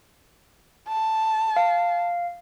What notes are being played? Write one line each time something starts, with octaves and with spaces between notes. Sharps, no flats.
A5
F5